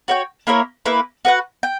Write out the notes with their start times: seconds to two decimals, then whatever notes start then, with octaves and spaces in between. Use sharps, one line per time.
0.08 F#4 C#5 G5
0.47 A#3 E4 A#4 C#5
0.86 A#3 E4 B4
1.25 F#4 B4 F#5
1.63 G5